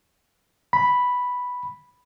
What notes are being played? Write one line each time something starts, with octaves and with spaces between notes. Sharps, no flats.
B5